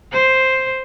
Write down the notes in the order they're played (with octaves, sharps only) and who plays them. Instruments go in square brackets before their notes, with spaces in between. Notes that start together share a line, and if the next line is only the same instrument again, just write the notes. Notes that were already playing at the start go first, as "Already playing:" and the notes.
[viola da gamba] C5